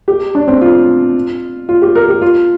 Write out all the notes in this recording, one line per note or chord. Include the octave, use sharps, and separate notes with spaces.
G4
D4
C4
F4
F4
G4
A#4
G4
F4